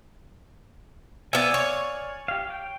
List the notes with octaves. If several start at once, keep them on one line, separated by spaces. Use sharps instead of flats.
B3 D5 E5 F5 G#5
C#5
G4 F5
G5